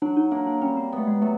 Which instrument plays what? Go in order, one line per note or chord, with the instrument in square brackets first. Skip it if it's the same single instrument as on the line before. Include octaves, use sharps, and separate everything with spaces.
[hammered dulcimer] F#3 [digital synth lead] D4
[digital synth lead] D#4
[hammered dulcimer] A#3 [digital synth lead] D4
[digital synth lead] D4
[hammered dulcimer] G3 [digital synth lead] C#4
[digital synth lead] C4
[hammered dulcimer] B3
[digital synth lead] A3
G#3
[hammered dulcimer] F#3 [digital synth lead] A3